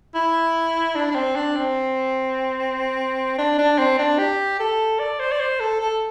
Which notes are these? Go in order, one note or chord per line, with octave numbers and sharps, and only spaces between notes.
E4
D4
D4
C4
D4
C4
D4
D4
C4
D4
G4
A4
D5
C5
D5
C5
A4
A4